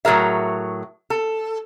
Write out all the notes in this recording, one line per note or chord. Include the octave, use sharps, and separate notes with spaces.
A2 F#3 G#4 A#4 E5
A4